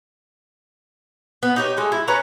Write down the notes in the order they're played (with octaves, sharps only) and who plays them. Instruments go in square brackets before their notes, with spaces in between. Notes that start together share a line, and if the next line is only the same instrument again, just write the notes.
[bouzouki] B3
D#4 G4 C#5
G#3 A3 F#4
E4
C#4 B4 C#5 A#5